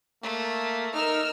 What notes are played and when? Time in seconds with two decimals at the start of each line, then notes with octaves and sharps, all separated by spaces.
0.23 A3 A#3
0.94 D#4 A#4 E6 F6